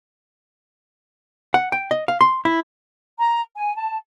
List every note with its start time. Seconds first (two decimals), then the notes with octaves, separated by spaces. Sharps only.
1.54 F#5
1.72 G5
1.91 D#5
2.08 F5
2.21 C6
2.45 E4
3.19 A#5
3.55 G#5
3.76 A5